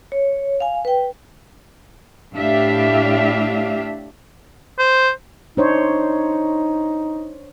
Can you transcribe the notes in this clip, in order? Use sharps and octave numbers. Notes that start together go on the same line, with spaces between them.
C#5
F5 G#5
B4 G5
A2 D4 G4 E5 F5
C5
D4 D#4 C5 C#5